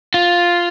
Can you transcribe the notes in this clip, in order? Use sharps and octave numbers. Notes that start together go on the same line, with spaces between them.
F4